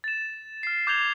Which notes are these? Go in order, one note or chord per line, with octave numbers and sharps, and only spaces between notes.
A6 E7
F6 C7
D6 G6 G#6 F7 G7